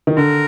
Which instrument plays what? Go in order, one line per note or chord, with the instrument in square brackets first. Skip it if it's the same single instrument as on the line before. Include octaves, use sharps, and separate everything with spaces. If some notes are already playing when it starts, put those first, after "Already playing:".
[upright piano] D#3
[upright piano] D3 [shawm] A#4